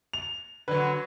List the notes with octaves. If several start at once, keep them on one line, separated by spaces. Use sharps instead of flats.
F7
D3 F#3 B4